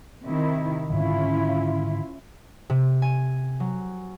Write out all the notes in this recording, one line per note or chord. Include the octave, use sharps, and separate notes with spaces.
C3 D#3 E4
G#2 D3 D#3 C#4 E4 F4
C3
G#5
F#3